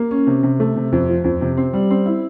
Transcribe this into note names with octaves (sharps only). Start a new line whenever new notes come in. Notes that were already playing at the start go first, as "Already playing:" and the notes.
Already playing: A#3
C#4
C3
C3
A3
C3
F2
F3
F2
C3
C4
G3
C4
E4